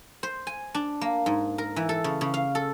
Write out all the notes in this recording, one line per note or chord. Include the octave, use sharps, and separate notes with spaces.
C5
G#5
D4
A#3
G#2
A#4
E3
A4
C#3
C#3
F5
A4